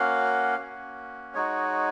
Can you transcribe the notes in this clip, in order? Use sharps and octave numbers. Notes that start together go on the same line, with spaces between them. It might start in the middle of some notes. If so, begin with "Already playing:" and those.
Already playing: A#3 C#4 F#4 F5
A#3 C#4 F#4
G#3 D#4 F#4 C#5